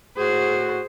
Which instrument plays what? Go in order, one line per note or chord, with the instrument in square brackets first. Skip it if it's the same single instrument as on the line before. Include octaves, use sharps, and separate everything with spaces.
[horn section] A2 F#4 [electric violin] G#4 [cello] C5